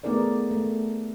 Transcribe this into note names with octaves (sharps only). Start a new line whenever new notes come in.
A3 B3 D#4 G#4 A#4 D5
A3